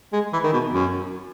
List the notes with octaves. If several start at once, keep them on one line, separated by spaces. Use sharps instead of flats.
G#3
E3
D#3
B2
F#2